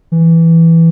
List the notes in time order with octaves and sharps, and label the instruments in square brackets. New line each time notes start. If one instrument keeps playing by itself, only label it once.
[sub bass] E3